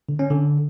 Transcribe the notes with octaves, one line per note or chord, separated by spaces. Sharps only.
D3
C#4
D3